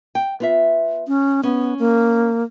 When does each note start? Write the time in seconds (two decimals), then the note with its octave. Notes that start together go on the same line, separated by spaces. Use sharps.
0.15 G5
0.40 B3 F4 E5
1.08 C#4
1.43 B3 C#4
1.79 A#3